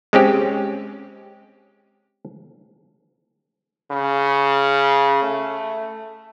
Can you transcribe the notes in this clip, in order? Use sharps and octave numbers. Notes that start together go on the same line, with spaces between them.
G#3 C4 C#4 G4
C#3
A3